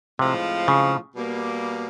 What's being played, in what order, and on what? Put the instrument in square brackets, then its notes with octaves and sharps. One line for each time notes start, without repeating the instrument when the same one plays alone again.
[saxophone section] A2 F3 G#3 C4 F4 [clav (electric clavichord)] C3
[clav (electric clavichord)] C#3
[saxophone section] B2 G3 A#3